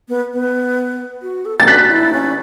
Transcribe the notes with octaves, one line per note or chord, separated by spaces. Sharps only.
B3
B3
F#4
A4
A4 A6
F#4 F#6 B6
E4
C#4